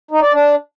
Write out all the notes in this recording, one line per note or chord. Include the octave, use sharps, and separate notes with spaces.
D#4
D5
D4